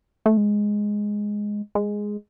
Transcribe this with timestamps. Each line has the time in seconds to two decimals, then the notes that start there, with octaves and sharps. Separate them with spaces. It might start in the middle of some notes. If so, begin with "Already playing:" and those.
0.26 A3
0.37 G#3
1.75 G#3